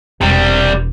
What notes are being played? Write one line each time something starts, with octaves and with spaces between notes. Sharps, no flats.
E1 C3 G3